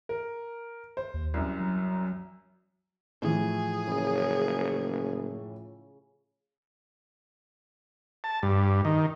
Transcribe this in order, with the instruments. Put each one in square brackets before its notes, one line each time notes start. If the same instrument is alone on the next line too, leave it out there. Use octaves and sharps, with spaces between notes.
[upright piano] A#4
C5
[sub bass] D#2
[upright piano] C2 F#2
[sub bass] F#3
[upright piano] A2 E3 F3 [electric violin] G#4
[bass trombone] F#1 [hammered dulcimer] C#3
[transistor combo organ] A5
G2
D#3